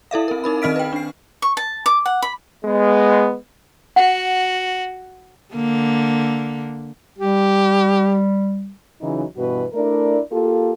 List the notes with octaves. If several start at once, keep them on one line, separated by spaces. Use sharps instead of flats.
E4 A4 E5 F5
C4 A#4
D#4 A#4 B5
D#3 C4 D#5 F6 B6 D7
B4 G5
D4 C7
C#6
A5
D6
F#5
B5
G#3 B3
F#4 F#5
D3 A#3
G3 G4
C#3 E3 F#3 D#4
G2 B2 E3 F#4 B4
A3 D4 E4 A#4 D5
A#3 F4 G4 A4